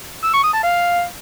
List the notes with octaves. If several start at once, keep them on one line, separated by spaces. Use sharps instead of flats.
E6
C#6
D#6
A5
F5